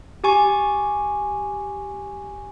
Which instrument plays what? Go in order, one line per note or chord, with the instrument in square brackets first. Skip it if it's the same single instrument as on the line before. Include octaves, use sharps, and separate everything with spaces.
[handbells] G4 G#5 C#6